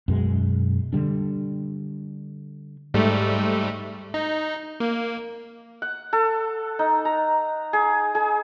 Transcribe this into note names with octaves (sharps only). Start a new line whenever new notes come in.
F#2 B2 G#3
D3 G3 D4
G#2 G3 A3
D#4
A#3
F#5
A4
D#4
A#5
G#4
G#4